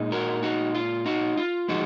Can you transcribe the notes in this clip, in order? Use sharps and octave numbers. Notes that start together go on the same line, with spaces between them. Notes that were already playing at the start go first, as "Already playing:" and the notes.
Already playing: A#2 G#3 D#4
F#4 A#4
D#4 F#4
F4
D#4 F#4
F4
F3 G#3 D#4 F#4